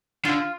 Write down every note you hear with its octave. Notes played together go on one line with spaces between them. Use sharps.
D3 F4